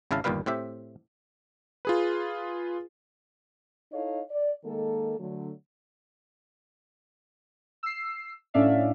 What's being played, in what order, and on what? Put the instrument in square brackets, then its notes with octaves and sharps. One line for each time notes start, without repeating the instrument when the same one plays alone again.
[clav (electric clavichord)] G#1 C#3 E4 F5 A5
G1 D#2 A#2 G3 B4 F5
A2 C4 G4 E5
[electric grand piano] F4 G#4 B4
[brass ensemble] D#4 E4 A4 C#5 D#5 F5
D5
D#3 G#3 A#3 A4
D3 F#3 A3
[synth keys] E6 C7
A2 C#4 D4 D5 E5 F5